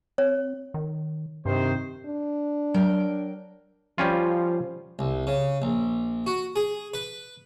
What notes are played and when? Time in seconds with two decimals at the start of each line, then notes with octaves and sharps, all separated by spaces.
0.18 C4 C#5
0.74 D#3
1.45 G2 C3 D#3 C5
2.06 D4
2.74 F#3 A#4 G5
3.98 F3 G3 C#4 F4
4.99 C2
5.27 C#3
5.62 A#1
6.27 F#4
6.56 G#4
6.94 B4